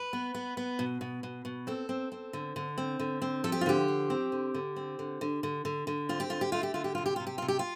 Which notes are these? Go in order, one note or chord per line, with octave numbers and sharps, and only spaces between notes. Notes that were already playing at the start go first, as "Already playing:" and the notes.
Already playing: B4
B3
B3
B3
B2
B2
B2
B2
C4 A4
C4
C4
D3
D3
C4
D3
C4
F3 A4
G4
F4
D3 G4
F3
C4
D3
D3
C4
D3
D3
D3
D3
D3
C4 F4
G4
D3 F4
G4
A3 F4
G4
D3 F4
G4
C3 F4
G4
C3 F4
G4
C3 F4
G4
F4